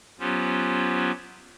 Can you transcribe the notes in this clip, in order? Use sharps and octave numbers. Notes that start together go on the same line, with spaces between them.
F#3 B3 C#4 F4 G4 C5